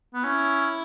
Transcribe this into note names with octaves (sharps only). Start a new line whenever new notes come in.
B3
C#4 E4